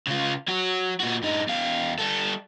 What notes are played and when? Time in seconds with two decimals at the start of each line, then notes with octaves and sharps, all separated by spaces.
0.08 C#3 F4
0.48 F#3 F#4
1.00 A#2 F#4
1.22 G2 D#4
1.47 E2 F5
1.98 G3 A4